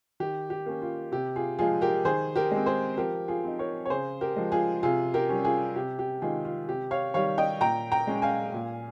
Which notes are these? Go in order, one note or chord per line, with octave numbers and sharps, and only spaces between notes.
D#3 G4
G4
A#3 C#4
F4
C3 G4
F4 G#4
F3 G#3 F4 G#4
G4 A#4
D#3 G#4 C5
G4 A#4
G#3 C4
G#4 C5
F3 G4 A#4
F4 G#4
C4 D#4
A#4 C#5
C#5
C#3 G#4 C5
G4 A#4
F3 G#3
F4 G#4
C3 F4 G#4
G4 A#4
G3 C#4
F4 G#4
C3 G4
G4
D#3 G#3 D#4 F4 G#4
F4
C3 G4
C#5 F5
D#3 G3 C#5 F5
D#5 G5
A#2 G5 A#5
G5 A#5
G#3 C#4
F5 G#5
A#2